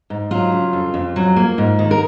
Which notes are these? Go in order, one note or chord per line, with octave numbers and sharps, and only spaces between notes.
G#2
F#3 F4
C#3
F2
F2
F#3
A#3
G#2
D#3
A#4